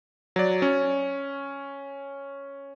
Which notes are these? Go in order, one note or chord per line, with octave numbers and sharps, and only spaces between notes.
F#3 D5
C#4